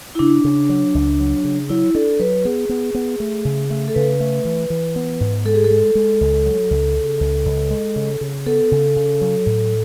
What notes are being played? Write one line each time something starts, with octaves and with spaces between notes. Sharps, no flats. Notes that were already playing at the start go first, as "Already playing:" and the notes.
E4
C#3 D4
C#3
F#3
C#2
F#3
C#3
F#3 E4
D4 A4
F#3 B4
B3 G#4
B3
B3
A3
C#3
A3
A4
C#3 B4
A3
E3
E3
B3
G#2
G#3 A4
G#4
A4
G#3
G#3
C#2
F#3
C#2
C#3
C#2
C#2
G#3
C#3
C#3
B3 A4
C#3
C#3
F#3
A2